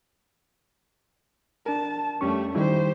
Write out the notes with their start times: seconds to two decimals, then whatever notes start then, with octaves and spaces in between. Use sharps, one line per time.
1.66 D4 A#4 A5
2.21 F2 G3 A3 C#4 C#6
2.55 D#3 G3 E4 G4 C5